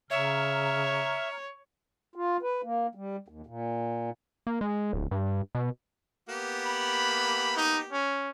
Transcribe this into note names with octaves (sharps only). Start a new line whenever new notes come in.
C#3 C#5 E5 A#5 F6
F4
B4
A#3
G3
D#2
A#2
A#3
G#3
D1
G2
B2
A#3 B3 G4
B5
D#4
C#4